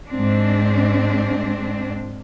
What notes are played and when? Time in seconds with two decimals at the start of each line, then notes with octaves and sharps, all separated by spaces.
0.10 G#2 C4 D4